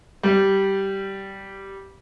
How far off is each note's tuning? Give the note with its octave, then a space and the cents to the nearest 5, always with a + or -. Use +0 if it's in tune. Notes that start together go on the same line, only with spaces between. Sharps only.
G3 -10